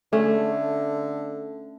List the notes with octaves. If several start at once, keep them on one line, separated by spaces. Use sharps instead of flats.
D3 A3 C#4